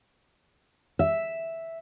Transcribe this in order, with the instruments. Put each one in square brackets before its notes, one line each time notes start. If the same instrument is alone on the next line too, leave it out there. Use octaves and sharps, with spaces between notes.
[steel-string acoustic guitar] E5